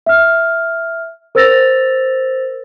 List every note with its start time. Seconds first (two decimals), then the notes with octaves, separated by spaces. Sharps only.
0.06 E5 F6
1.35 A#4 C5 E6 A6 A#6 F7